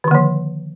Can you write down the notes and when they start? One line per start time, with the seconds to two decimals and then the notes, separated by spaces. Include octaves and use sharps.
0.04 D#3
0.08 D3
0.11 A#3
0.15 F3